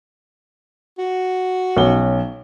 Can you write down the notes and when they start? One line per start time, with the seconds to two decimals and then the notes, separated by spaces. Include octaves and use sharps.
0.98 F#4
1.77 B1 C#4 G7